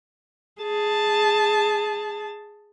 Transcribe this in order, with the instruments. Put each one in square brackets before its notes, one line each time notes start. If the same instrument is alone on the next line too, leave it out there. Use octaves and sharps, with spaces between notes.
[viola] G#4 A5